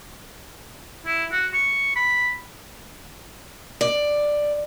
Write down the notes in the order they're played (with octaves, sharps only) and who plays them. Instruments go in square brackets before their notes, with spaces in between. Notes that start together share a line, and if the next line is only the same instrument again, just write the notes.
[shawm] E4
F#4
C#6
B5
[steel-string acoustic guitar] D5